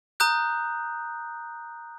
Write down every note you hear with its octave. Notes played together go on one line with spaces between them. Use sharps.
A#5 D#6 F#6 G6